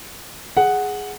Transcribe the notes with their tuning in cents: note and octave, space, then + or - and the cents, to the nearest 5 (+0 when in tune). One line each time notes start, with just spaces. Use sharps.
G#4 +0 F#5 +0